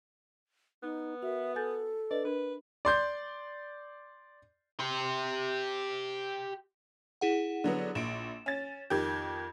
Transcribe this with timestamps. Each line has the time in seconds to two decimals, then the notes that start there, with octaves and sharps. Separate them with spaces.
0.83 B3 D#4
1.23 F#4 A#4 E5
1.56 A4 G#5 G6 A6
2.11 D4 B4 D5 D#5
2.25 D4 A#4 B4
2.85 D5 C6 G6
4.79 G4 C6
7.21 E4 G#4 F#5
7.64 D3 F#3 B3
7.95 A#1 D7 E7
8.46 C#4 A6
8.90 F2 D#3 G4 G6 G#6